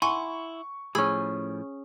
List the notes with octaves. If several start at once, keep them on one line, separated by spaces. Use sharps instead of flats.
E4 F#5 G#5 C6 C#6
A2 F3 C#4 G#4 B5 E6 G#6